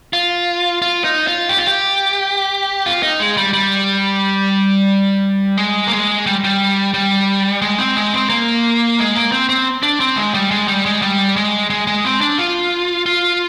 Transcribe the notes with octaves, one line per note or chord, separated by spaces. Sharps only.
F4
F4
D#4
F4
G4
F4
G4
F4
D#4
G#3
G3
G3
G#3
A#3
G#3
G3
G3
G3
G#3
C4
G#3
C4
A#3
G#3
A#3
C4
C4
D4
C4
G#3
G3
G#3
G3
G#3
G3
G#3
G#3
G#3
C4
D4
F4
F4